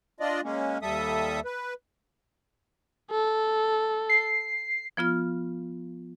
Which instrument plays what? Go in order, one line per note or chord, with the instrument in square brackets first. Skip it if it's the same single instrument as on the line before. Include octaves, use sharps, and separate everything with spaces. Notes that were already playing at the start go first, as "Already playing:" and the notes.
[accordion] D4 F4 D5 D#5
G#3 A#3 C#4
D#2 G3 A4 E5 D#6
B4
[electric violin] A4
[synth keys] C7
[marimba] F3 B3 F4 F6